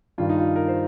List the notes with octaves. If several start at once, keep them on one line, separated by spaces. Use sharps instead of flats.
G2 D#3 G3 F4
D#4
F4
A#4
C5